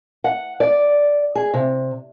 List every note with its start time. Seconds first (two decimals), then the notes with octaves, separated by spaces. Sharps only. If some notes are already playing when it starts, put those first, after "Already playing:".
0.24 F#5
0.60 D5
1.35 G#4
1.54 C3